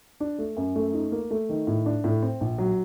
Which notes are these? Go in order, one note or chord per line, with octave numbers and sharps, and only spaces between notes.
D4
A3
F#2
A3
D#4
A#3
A3
D#3
A2
D4
A2
C4
A#1
F#3